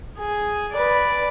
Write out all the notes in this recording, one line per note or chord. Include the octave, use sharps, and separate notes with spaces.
G#4
B4 D5